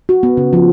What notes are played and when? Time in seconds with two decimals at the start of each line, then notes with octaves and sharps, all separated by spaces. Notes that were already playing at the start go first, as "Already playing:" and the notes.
0.09 F#4
0.23 B3
0.37 C#3
0.53 F3